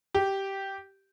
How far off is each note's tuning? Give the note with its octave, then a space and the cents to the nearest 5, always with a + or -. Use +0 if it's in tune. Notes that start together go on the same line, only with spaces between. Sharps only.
G4 -10